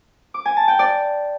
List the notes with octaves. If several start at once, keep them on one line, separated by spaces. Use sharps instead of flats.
D6
G#5
A5
G5
D5